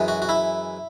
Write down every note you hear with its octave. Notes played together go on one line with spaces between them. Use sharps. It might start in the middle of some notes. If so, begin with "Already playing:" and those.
Already playing: F#2 E3 G#3
F#4
F#4
E4